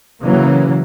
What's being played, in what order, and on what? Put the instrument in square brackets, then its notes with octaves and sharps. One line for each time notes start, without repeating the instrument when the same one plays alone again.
[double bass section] C#3 E3 F#3 A#3